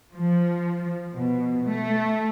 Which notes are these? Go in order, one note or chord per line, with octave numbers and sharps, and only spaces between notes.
F3
B2
A3